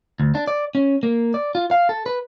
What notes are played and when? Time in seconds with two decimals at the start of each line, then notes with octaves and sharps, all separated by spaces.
0.20 D2
0.35 D4
0.48 D5
0.75 C#4
1.03 A#3
1.34 D5
1.55 F4
1.71 F5
1.89 A4
2.06 B4